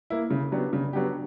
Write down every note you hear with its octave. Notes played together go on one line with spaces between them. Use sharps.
A#3 E4
C#3
F#3 B3 D4 G4
C#3
F#3 B3 D4 G4